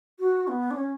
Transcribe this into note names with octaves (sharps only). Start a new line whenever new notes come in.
F#4
B3
D4
C#4